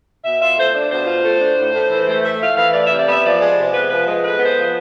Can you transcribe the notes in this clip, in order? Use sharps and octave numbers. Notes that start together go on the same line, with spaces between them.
B2 E5
F4 E5
A3 C5
D4 D5
B2 C5
F4
A3
D4
A2
A2
E3
A3
A2 E5
A2 F5
E3 F5
A3 D5
C3 E5
D5
B3
E5
F3 D5
G#3
C3
B3 B4
F3 B4
G#3 B4
A2 B4
B3
C5
F3